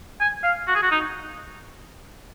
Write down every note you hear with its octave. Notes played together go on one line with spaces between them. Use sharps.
G#5
F5
F#4
G#4
F#4
D#4